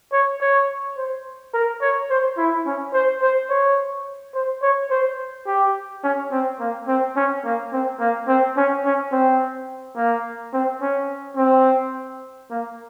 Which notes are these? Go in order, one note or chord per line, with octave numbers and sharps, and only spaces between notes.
C#5
C#5
C5
A#4
C#5
C5
E4
C#4
C5
C5
C#5
C5
C#5
C5
G4
C#4
C4
A#3
C4
C#4
A#3
C4
A#3
C4
C#4
C#4
C4
A#3
C4
C#4
C4
A#3